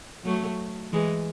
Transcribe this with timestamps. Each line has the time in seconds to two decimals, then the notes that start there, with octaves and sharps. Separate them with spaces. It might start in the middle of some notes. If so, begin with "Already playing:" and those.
0.25 F#3 A3
0.93 E3 G#3